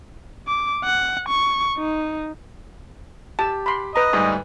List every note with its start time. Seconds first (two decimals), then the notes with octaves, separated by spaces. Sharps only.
0.47 D6
0.84 F#5
1.29 C#6
1.78 D#4
3.39 G4 A5
3.66 B5 C6
3.96 B4 D#5 A#5
4.13 D2 G#2 G3